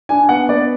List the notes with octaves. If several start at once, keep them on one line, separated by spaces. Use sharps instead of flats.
D4 G#5
B3 F#5
B3 D5